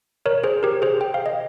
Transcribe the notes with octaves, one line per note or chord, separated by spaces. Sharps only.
A#4 C#5
G#4 C5
G4 A#4
G#4 C5
G5
F5
D#5